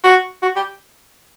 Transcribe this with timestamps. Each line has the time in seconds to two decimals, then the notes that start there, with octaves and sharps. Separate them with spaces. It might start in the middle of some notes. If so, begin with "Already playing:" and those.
0.03 F#4
0.42 F#4
0.56 G4